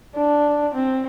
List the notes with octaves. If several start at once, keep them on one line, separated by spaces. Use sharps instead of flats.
D4
C4